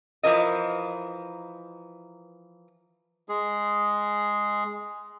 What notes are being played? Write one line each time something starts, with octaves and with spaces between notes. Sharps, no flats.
E3 F3 A#4 D#5
G#3 G#4